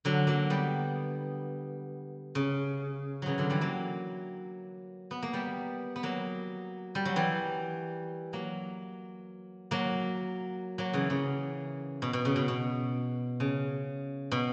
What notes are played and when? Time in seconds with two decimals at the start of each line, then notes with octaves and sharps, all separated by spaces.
0.05 D3 F#3
0.27 F#3 A#3
0.50 G3 B3
2.35 C#3
3.22 C#3 E3 F#3
3.38 D3 F#3
3.50 E3 G3
3.61 F#3 A#3
5.11 B3
5.23 A#3
5.33 G3 B3
5.96 B3
6.03 F#3 A#3
6.95 G3
7.05 F#3
7.16 E3 G3
8.33 F#3 A#3
9.71 F#3 A#3
10.78 F#3 A#3
10.93 C#3 E3
11.10 C#3
12.02 B2
12.13 B2
12.25 C#3
12.36 B2
12.48 B2
13.40 C#3
14.32 B2